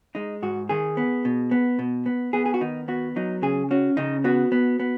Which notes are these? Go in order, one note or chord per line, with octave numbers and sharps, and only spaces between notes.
G#3 D#4
G#2 F#4
D#3 G#4
B3
B2
B3
B2
B3
B3 G#4
G#4
F#4
D#3 D#4
B3 F#4
F#3 D#4
C#3 G#4
C#4 F#4
C#3 D#4
B3 F#4
B3
B3